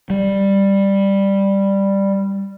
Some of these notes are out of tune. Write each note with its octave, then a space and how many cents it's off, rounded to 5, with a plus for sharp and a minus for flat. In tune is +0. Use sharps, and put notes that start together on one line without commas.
G3 +5